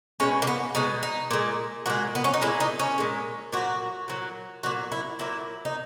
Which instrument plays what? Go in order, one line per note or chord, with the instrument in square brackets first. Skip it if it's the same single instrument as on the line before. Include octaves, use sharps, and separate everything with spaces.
[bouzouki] B2 G#3 C#4
A#3
B3
B2 G#3 D#4
D#4
A#2 G#3
A#2 G#3 F#4
B3
C#4
D#4
A#2 G#3 E4
D#4
C#4
A#2 G#3
A#2 F#3 F#4
A#2 F#3
A#2 F#3 F#4
E4
A#2 F#3 E4
D#4